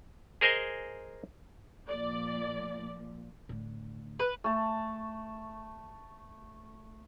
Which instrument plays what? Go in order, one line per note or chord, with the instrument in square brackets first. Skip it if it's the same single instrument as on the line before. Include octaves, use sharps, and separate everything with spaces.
[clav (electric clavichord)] G#4 A#4 C5 D#5 G#5
[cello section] A#2 F3 [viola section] D5
[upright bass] A2 D3
[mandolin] B4
[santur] A3 A5